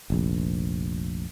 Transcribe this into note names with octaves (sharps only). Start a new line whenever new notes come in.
F1 A#1